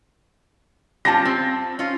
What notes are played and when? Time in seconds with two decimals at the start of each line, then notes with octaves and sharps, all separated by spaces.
1.05 G3 C#4 F4 A5 A#6
1.25 C4
1.79 C#4 F4